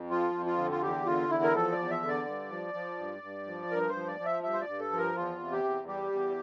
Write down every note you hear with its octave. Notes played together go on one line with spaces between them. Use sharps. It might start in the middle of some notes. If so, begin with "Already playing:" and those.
Already playing: F2
F3 F4
F2
F4
D3
F4
E2 G4
D3 F4
E2 E4
A#4
F3 A4
D5
E2
E5
D3
D5
G2
F3
F3
G2
G2
F3
G2 A#4
C5
F3
D5
F3
E5
G2 E5
C5
D5
G2
A4
F3
A#4
E2 F4
C3
G4
E2
G3 G4
E2